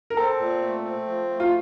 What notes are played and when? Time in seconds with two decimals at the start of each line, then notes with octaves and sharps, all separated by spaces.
0.10 A#4
0.17 C4 A4
0.39 A#2
0.62 A3
0.84 C4
1.07 F3
1.30 A3
1.40 F4